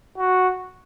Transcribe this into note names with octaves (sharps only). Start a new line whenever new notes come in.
F#4